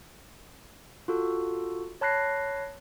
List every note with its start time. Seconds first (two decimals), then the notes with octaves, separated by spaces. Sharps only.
1.08 F4 F#4 A4
2.01 C#5 A5 B5 F#6 A#6 C7